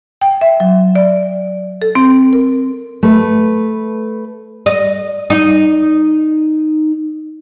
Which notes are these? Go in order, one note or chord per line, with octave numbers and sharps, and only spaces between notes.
G5
E5
F#3
D5
A4
C4
A#4
A3 B4
D#5
D#4